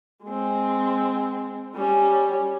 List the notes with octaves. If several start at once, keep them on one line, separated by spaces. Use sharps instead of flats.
G#3 C4
G3 C#4